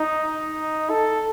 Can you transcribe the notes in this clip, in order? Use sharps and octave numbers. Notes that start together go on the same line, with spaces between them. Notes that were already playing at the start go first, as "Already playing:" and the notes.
Already playing: D#4
A4